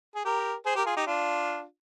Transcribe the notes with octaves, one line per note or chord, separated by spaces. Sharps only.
G#4
G4 A#4
G#4 C5
G4 A#4
F4 G#4
D#4 G4
D4 F4